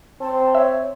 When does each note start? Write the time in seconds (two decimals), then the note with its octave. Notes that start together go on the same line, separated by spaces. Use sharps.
0.21 C4 A5
0.55 C#5 E5